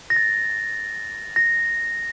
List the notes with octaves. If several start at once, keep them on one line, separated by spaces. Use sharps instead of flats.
A#6
A6
A#6